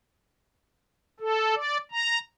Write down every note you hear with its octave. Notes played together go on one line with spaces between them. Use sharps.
A4
D5
A#5